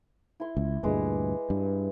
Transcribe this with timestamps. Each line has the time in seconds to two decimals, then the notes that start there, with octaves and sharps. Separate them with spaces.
0.40 E4 C6
0.57 C#2
0.83 D2 G2 A#2 G#3 B4 D6
1.50 G2